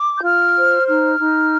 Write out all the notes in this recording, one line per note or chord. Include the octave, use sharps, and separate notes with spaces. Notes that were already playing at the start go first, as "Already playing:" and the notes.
Already playing: D6
G6
F4 F6
C5
D#4 F6
D#4